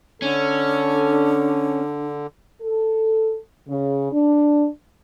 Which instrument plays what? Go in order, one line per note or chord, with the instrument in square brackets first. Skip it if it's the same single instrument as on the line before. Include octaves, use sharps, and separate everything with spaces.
[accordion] D3 [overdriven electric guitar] C#4 [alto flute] D4 [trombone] A4
[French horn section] A4
C#3
D4